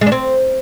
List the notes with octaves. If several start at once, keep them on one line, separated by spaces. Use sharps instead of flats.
G#3
D4
C4